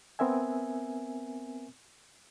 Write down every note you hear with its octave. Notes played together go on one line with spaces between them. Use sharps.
B3 C4 A#4 E5 G#5